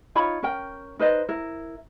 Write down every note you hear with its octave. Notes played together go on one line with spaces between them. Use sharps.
D#4 F4 C#5 B5
C#4 A#4 G5
D#4 B4 C5 D#5
E4 A#4